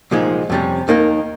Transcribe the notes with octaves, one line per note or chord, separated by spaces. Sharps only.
C2 A#2 F3 G#3 D#4
F2 C3 G3 C#4
D#2 D#3 A#3